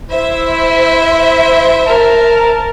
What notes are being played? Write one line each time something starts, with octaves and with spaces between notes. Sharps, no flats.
E4 C5 E5
A#4 A5